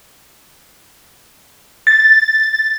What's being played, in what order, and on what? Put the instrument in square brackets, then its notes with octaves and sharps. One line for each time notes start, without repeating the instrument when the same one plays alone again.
[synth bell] A6